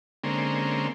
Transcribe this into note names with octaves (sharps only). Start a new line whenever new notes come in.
D3 G#3 A#3 C4 C#4